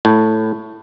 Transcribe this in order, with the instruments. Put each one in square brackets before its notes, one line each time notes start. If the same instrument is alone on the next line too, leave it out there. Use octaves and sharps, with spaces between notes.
[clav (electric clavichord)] A2